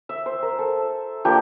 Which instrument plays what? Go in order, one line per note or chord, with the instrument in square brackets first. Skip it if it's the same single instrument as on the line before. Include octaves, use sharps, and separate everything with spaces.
[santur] E5
C5
A#4
A4
F3 A#3 D4 G4